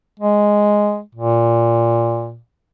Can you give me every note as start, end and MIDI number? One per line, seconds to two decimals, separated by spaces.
0.19 1.00 56
1.15 2.37 46